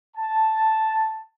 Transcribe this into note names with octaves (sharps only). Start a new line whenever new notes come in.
A5